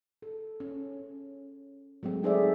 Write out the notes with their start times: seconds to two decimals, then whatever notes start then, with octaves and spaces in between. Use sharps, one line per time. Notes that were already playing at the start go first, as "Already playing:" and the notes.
0.22 A4
0.60 C#4
2.03 F#3 G#3 A3 C4
2.23 D#4 G#4 A4 C5 D5 E5